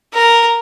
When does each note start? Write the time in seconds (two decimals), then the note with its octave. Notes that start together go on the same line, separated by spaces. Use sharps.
0.14 A#4